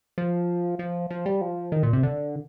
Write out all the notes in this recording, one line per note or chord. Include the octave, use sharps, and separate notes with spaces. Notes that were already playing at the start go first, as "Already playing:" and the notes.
F3
F3
F3
G3
F3
D#3
A#2
C3
D3